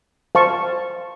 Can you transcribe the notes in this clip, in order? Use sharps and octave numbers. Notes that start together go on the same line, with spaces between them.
C5 F5 A5 C#6